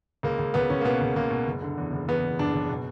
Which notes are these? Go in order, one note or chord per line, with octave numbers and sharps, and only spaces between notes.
C#2 A#3
C#2
C#2 B3
C#2 C#4
A#3
B2 B3
C#2
C#2 A#3
B2
F#1
D3
E2
F#1
E2 B3
F#1
F#1 D4
F#1
B2